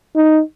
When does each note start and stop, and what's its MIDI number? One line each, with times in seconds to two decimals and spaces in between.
0.16 0.40 63